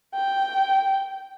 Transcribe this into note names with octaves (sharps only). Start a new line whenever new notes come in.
G5